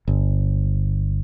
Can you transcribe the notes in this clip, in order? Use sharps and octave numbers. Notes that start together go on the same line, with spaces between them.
G1